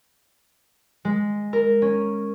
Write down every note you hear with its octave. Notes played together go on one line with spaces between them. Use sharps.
G#3
A#4
C#4